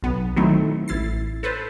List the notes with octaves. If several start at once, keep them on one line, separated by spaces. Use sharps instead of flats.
B1 B3
D#3 F#3 A3 C4 D#4 E4
A1 E4 A6 C7
A4 B4 C5 A5